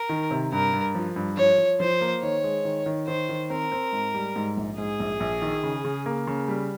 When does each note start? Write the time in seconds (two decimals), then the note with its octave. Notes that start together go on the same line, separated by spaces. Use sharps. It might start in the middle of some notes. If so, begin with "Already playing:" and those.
Already playing: A#4
0.09 D#3
0.31 C3
0.52 G2 A#4
0.73 G2
0.95 F3
1.16 G2
1.37 F3 C#5
1.58 F3
1.80 F3 C5
2.01 A#3
2.22 D#3 C#5
2.44 G#3
2.65 D#3
2.86 D#3
3.07 D#3 C5
3.29 D#3
3.50 C4 A#4
3.72 C4
3.92 G#2
4.14 G3
4.36 G#2
4.57 A#1
4.78 G#2 G#4
5.00 A#1
5.20 A#1
5.42 D#3
5.64 C#3
5.85 C#3
6.06 A#3
6.27 C#3
6.48 G3